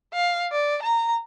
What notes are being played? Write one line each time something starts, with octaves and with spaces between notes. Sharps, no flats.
F5
D5
A#5